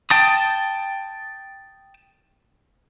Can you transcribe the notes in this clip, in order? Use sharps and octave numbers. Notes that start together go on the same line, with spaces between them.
G5 A5 D#6